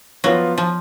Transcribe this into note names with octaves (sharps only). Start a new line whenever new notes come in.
F3 F#3 B3 F4
F3